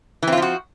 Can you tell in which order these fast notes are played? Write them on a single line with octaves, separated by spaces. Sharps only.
E3 C4 F4 F3 F#4